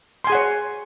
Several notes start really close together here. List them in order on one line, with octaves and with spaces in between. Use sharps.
C6 G#5 G#4 F#5 C#5